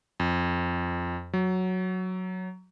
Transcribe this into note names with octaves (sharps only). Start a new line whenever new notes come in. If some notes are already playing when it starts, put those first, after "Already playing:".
F2
F#3